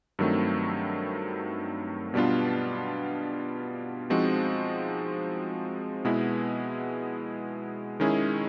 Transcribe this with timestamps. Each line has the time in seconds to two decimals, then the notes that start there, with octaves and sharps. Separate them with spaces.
0.19 G2 D#3 F#3 A3 C4
2.14 B2 G3 B3 D4 F4
4.10 F3 G#3 C4 D#4 F#4
6.05 B2 G#3 B3 E4
8.00 D#3 G#3 C#4 E4 G#4